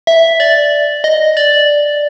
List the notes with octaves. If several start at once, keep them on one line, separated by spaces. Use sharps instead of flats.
E5
D5
D#5
D5